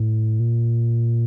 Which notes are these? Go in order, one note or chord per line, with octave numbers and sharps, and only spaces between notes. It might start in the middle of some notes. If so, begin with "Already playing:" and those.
Already playing: A2
A#2